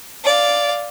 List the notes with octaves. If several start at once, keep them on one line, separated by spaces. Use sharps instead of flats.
D5 F5